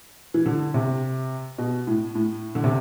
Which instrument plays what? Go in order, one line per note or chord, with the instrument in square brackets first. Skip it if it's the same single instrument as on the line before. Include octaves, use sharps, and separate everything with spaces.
[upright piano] E3
D3
C3
B2
A2
A2
D3
C3